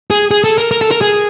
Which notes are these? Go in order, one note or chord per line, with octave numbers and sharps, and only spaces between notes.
G#4
G#4
A4
A#4
A#4
A4
A#4
G#4